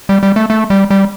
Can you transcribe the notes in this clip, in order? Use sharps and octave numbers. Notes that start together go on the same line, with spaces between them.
G3
G3
A3
A3
G3
G3